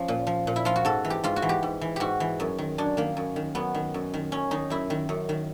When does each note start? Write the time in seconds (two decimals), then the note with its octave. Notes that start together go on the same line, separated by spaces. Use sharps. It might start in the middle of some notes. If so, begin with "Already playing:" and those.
Already playing: F3 C#4
0.08 A#2
0.27 F3
0.47 A#2
0.56 E4
0.65 F3 F4
0.76 F#4
0.85 G#2 A4
1.05 E3
1.10 G4
1.24 G#2 F4
1.36 F#4
1.42 E3
1.49 G4
1.63 G#2
1.81 E3
1.96 G#2 F#4 G4
2.20 E3
2.40 F#2
2.58 D#3
2.78 F#2 D4
2.97 D#3 A#3
3.17 F#2
3.36 D#3
3.55 F#2 B3
3.74 D#3
3.94 F#2
4.14 D#3
4.32 F#2 C#4
4.51 D#3 D#4
4.70 F#2 E4
4.90 D#3
5.09 F#2
5.29 D#3